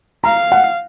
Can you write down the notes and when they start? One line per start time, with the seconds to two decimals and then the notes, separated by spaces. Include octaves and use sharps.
0.24 F5 A#5
0.52 F#5